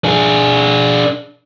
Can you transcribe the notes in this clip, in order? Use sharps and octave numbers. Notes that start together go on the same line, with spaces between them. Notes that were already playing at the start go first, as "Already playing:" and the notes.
D4 G#4